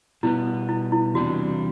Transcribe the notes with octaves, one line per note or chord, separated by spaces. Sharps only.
B2 G3 B3 E4
E4
E4
E2 C3 G3 D4 F#4